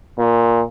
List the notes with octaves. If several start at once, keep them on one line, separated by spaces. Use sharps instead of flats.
A#2